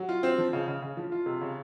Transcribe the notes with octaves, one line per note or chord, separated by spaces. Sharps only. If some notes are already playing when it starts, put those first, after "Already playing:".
Already playing: F#3
F4
C4
F3
C#3
C#3
C#3
F3
F4
C3
C#3